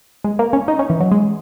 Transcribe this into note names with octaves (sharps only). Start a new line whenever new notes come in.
G#3
A#3
C#4
D#4
C#4
E3
F#3
G#3